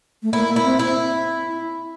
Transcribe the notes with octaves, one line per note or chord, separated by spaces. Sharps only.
A3
A#3 E4
A#3
E4
C4
E4